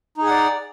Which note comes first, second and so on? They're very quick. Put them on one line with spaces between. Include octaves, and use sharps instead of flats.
D#4 G#4 F#5 D5